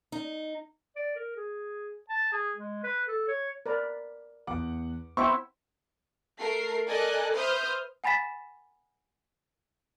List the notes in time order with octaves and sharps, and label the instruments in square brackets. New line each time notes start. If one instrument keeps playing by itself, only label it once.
[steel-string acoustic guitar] D#4
[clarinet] D5
A#4
G#4
A5
G#4
G#3
B4
A4
C#5
[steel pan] A#4 B4 D5
[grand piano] E2 F#5 D6
[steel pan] B3 E5 G5 [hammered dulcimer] C4 E4 [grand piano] C#6
[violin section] A3 A4 A#4 C7
A4 A#4 D5 D#5 G#5 F#6
B4 C5 E5 D#6 F6 G6
[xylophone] F#5 G#5 B5 A6 B6 E7